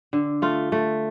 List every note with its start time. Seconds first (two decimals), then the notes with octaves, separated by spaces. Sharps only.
0.13 D3
0.42 A3 F4
0.72 A3